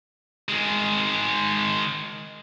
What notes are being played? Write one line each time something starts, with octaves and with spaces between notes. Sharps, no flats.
D#3 G#3